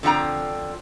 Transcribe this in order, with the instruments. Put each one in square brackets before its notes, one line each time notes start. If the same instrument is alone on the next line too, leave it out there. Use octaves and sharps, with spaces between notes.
[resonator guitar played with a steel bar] D3 F3 C4 G5 A#5